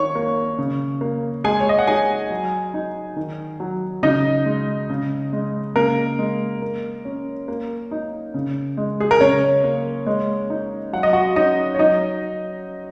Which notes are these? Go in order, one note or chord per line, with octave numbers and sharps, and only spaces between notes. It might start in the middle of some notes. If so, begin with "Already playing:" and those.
Already playing: D#3 C#5 C#6
A#3
C#3
A#3
G#3 G#4 G#5
C#5
D#5
F#5
D#4 G#4 G#5
F#3
D#4
D#3
F#3
C#3 D#4 D#5
G#3
C#3
G#3
C#3 A#3 A#4
G#3
A#3
C#4
A#3
D#4
C#3
G#3
G#4
A#4
C#3 C#4 C#5
A#3
G#3
D#4
F#3 F#5
D#5
F#4 F#5
C#4 D#4 D#5
C#5
F#3 D#4 D#5